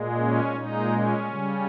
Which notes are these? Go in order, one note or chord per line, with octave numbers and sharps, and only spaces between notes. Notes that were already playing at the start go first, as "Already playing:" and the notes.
Already playing: A#2 G#3
C#4
A#2 G#3 D#4
C#4
C#3 G3